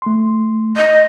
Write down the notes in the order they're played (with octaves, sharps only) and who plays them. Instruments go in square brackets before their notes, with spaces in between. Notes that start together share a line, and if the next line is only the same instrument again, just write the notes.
[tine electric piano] A3 C6
[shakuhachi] D#5